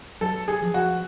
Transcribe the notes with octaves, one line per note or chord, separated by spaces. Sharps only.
F#3 A4
G#4
F3
F#4